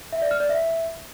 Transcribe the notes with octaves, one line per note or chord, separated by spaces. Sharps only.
E5
D5
F6
D5
E5